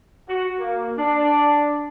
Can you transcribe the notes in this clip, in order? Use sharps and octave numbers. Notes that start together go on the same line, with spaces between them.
F#4
A#3
D4